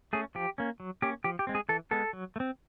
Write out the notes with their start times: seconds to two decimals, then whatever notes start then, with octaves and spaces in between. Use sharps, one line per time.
0.13 A3 C#4 G#4
0.35 F3 G4
0.58 A#3 C#4
0.80 F#3
1.02 A#3 C#4 G4
1.24 F3 G4
1.39 G4
1.47 G#3 C4
1.55 G#4
1.69 E3 A4
1.91 G#3 B3 A4
2.13 F#3
2.36 A3
2.40 C4